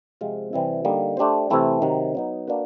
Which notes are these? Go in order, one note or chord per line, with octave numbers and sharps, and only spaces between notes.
C3 F3 G#3 C4 F4
C3 E3 G3 C4 E4
D3 G3 A#3 D#4
A3 D4 G4 C5
C3 E3 A3 C4 E4
C3 D#3 F#3
F#3 B3 D#4
A#3 D4 F#4 B4